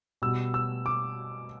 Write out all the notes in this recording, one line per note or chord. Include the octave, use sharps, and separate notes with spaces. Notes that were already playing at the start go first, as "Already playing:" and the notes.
B2 G3 B3 E6
E6
D6